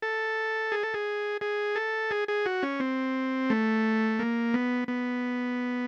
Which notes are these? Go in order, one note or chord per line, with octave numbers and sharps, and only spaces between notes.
A4
G#4
A4
G#4
G#4
A4
G#4
G#4
F#4
C#4
C4
A3
A#3
B3
B3